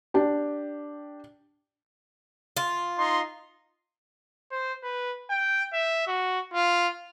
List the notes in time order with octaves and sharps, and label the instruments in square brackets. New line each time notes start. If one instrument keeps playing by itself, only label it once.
[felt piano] D4 G4
[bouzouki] F4
[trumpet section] D#4 C6
[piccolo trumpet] C5
B4
G5
E5
F#4
F4